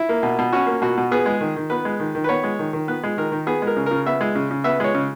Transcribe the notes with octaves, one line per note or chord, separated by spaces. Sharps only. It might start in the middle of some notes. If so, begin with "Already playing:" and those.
Already playing: E4
A#3
B2
B2
C#4 F#4
A#3
B2 F#4
B2
B3 G#4
G#3
D#3
D#3
B3 B4
G#3
D#3
D#3
B4
B3 C#5
G#3
D#3
D#3
B3 B4
G#3
D#3 A#4
D#3
B3 G#4
G#3 A#4
C#3
C#3 A#4
B3 E5
G#3
C#3
C#3
B3 E5
G#3 C#5
C#3